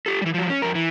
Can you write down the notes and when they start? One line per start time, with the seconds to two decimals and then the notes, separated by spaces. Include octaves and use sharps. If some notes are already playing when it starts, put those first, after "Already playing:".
0.06 G4 A4
0.22 E3 G3
0.34 F3 F#3
0.50 C#4
0.62 F2 A#4
0.75 E3